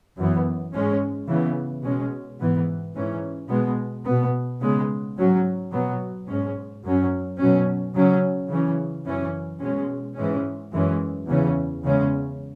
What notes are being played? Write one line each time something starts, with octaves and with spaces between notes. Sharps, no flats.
F#2 E3 B3
G#2 G#3 C#4
C#3 E3 B3
B2 G#3 C#4
G#2 E3 B3
G#2 E3 C#4
B2 G#3 B3
B2 B3
C#3 G#3 B3
G#2 F#3 C#4
B2 F#3 B3
G#2 G#3 C#4
F#2 F#3 C#4
B2 F#3 C#4
C#3 F#3 C#4
C#3 E3 C#4
F#2 E3 C#4
B2 G#3 C#4
G#2 E3 G#3 C#4
F#2 E3 G#3 C#4
E2 C#3 E3 C#4
E2 C#3 G#3 C#4